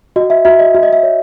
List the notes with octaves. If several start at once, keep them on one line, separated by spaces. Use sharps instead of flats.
F#4 D#5
E5
F#4 E5
D#5
F#4 E5
D#5
E5
C#5